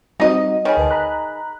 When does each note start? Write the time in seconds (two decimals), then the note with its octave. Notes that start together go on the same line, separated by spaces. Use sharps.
0.20 G3 C4 D#4 F#4 D#5
0.65 D#3 G#4 C#5 B5
0.77 D2 B4 A5
0.91 A#5 B5 F#6